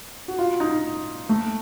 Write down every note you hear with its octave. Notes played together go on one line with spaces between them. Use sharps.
F#4
F4
D#4
A3